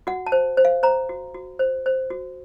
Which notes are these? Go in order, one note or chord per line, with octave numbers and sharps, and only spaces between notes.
F#4 F#5
A5
C5
C5
F5
C5 A#5
F#4
F#4
C5
C5
F#4